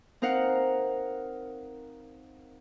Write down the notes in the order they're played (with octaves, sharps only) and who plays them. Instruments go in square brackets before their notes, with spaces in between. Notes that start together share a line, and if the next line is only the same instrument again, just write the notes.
[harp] C4 D#4 A#4 F5 F#5